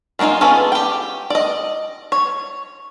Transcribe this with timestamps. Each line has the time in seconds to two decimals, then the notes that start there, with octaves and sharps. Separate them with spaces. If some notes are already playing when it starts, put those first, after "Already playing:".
0.19 G#3 A#3 D4 D#4 F4
0.41 B3 C#4 F4 G#4 A4
0.72 G4 G5
1.30 D5 D#5
2.12 C#5